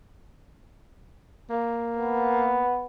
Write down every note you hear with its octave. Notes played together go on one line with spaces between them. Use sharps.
A#3
B3